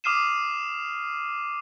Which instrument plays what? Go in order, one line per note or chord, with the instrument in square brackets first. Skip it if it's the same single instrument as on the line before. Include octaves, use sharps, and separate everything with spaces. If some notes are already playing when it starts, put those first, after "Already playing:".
[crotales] D6 D#6 F6 C7 D#7 E7